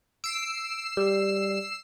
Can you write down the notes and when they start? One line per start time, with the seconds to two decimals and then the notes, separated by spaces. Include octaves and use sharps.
0.24 E6 C7 D7
0.97 G3